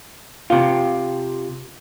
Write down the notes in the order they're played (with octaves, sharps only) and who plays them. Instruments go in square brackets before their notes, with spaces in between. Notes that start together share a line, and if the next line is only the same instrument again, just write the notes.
[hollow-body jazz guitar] C3 F4